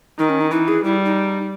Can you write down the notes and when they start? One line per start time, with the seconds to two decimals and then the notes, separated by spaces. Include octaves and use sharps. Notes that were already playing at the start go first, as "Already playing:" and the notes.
0.19 D#3 D#4
0.29 C#4
0.41 D#4
0.51 E3 D#4
0.68 G#4
0.84 G3 E4
1.05 D#4